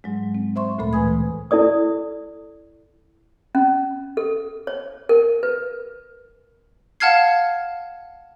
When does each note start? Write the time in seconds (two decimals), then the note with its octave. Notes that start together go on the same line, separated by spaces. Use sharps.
0.04 G#2 F#3 G#3
0.35 C4
0.56 C5 E5 C6 C#6
0.78 D2 A#2 A3 A4 B5
0.93 A2 E3 B4 G#5 D#6 G#6
1.51 E4 A4 D5 D#6
3.55 C#4
4.17 A4
4.67 C#5
5.09 A#4
5.43 B4
7.00 F5 F#5 A5 F6 G#6 C7